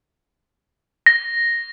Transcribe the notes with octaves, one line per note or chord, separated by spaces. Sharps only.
A#6